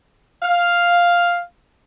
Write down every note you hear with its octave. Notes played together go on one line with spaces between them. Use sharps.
F5